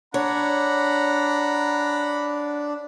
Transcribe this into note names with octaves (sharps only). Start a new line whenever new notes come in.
D4 C#5 F#5 A#5 B5